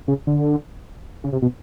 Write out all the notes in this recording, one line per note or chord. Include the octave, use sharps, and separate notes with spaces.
C#3
D3
C#3
C3
B2